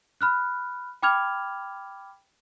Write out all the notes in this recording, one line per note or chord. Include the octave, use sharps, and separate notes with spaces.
B5 F6 F#6
G5 B5 D6 F6 G#6 F7